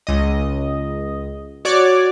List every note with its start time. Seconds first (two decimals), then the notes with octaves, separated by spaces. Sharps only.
0.07 C#2 D#5
1.65 F#4 C#5 D5 D6